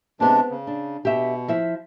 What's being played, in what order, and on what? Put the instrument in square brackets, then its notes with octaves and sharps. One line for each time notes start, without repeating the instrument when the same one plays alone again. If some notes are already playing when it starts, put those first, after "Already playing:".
[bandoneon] C3 G#3 D4 [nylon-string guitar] B3 C4
[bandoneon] C#3
[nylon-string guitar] D4
[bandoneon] B2 [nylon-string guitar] G4 E5
[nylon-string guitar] F3 E4 E5